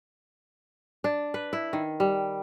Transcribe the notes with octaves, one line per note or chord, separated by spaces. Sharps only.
D4
B4
E4
D#3
G3